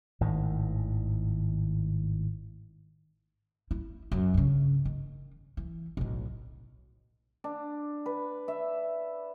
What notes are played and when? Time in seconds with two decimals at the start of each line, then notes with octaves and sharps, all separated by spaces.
0.21 G#1 A2 D#3
3.71 E4
4.12 F#2
4.34 G2 C#3
4.85 D#3
5.57 E3
5.97 B1 A2
7.44 D4
8.06 B4
8.48 E5